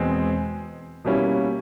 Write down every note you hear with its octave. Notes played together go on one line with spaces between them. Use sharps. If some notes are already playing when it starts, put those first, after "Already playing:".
Already playing: E2 B2 G#3 C4
B2 G3 A#3 C#4 E4